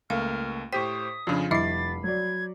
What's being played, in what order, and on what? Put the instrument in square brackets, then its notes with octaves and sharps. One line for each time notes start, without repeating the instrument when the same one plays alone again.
[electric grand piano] C#2 A3 [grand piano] A#3 [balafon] F5 [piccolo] F6
[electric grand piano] A2 G4 C5 [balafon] G5 [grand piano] C#6 B6 [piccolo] D#6
[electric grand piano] F2 C#3 G#4 [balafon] F3 D4 [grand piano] F4
[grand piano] F1 D6 [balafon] G3 E4 D#5 [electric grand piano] B5 C7 [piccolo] A6
[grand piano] F#3 F#4 D5 [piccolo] G#6